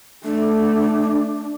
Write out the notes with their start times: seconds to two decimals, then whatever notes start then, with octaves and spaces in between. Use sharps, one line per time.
0.24 A3 D4